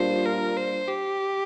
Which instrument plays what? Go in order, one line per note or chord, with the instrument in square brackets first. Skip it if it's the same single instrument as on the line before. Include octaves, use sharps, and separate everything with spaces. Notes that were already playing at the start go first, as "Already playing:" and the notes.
Already playing: [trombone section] A#2 G3 D4 F4 [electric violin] C5
[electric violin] A#4
C5
G4